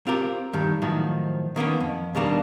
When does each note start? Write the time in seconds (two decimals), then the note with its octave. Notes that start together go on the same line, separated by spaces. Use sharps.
0.07 C4 F4 G4 A#4
0.53 G2 D#3
0.82 A2 D#3 F3 F#3
1.56 D#3 A#3 B3 C#4
1.80 F2
2.15 D#2 B2 G3 A#3 D4